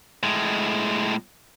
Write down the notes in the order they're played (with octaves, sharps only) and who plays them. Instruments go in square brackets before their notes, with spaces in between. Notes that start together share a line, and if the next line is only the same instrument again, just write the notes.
[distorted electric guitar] A2 G#3